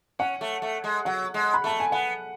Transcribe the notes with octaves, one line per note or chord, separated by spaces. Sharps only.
C#4 F#5
A3
A3
G#3
F#3 F#5
G#3
B5
A3 A5
G#5
B3 F#5